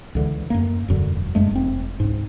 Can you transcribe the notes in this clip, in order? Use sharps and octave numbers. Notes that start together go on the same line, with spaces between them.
C#2 D3 E3
F#2 A#3
E1 F#2 D3
F#2 G#3 A3
F1 C4
C#2 G#2